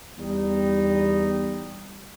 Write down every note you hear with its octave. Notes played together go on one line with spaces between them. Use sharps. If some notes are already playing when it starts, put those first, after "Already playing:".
E2 G3 D#4